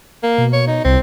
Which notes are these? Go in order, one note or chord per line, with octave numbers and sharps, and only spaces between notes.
A#3
B2
C#5
D#4
C2 C4